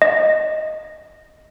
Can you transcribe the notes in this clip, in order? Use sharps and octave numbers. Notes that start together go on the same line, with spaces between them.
D#5